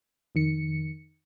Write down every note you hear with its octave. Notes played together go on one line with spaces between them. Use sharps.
F2 D#3 C#7